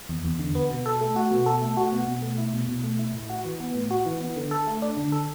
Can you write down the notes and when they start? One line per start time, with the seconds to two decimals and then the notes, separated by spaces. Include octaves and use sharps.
0.09 E2
0.25 E2
0.39 D3
0.55 B3
0.70 B2
0.86 A4
1.01 A3
1.16 F#4
1.31 B2
1.46 A4
1.62 A3
1.77 F#4
1.92 B2
2.08 B2
2.22 A3
2.38 E4
2.54 B2
2.68 B2
2.84 A3
2.99 E4
3.14 A2
3.30 F#4
3.45 E3
3.60 B3
3.75 A2
3.91 F#4
4.06 E3
4.20 B3
4.36 D3
4.51 A4
4.67 A3
4.82 D4
4.97 D3
5.12 A4